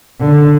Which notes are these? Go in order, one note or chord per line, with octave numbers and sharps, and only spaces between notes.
D3